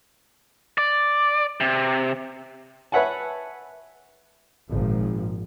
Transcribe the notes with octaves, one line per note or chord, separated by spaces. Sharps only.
D5
C3
B4 C#5 E5 F#5 G#5 A5
G#1 A#2 F3